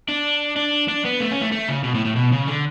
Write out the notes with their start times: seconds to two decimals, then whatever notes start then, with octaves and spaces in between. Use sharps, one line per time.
0.08 D4
0.56 D4
0.88 D4
1.05 B3
1.20 A3
1.31 C#4
1.41 A3
1.52 A3
1.69 C#3
1.84 B2
1.94 A2
2.05 A2
2.15 B2
2.32 C#3
2.48 D3